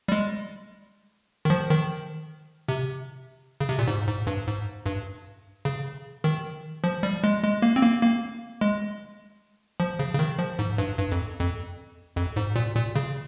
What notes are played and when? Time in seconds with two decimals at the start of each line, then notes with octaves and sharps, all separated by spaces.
0.08 G3
0.12 G#3
1.45 D#3
1.50 F3
1.71 D#3
2.68 C3
3.61 C#3
3.69 C3
3.79 A#2
3.88 G#2
4.07 G#2
4.27 G2
4.47 G#2
4.86 G2
5.65 C#3
6.24 D#3
6.84 F3
7.03 G3
7.24 G#3
7.43 G#3
7.62 A#3
7.76 C4
7.83 A#3
8.02 A#3
8.61 G#3
9.80 F3
9.99 C#3
10.14 C#3
10.19 D#3
10.39 F3
10.59 G#2
10.78 G2
10.98 G2
11.12 F2
11.39 F2
12.16 F2
12.36 G#2
12.56 A#2
12.76 A#2
12.96 C#3